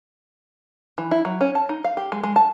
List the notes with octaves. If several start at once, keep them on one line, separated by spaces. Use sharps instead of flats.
E3
E4
F#3
C#4
A5
D#4
F5
G4
G#3
G#3
A5